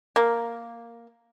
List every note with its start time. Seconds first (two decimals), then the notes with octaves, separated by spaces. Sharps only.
0.16 A#3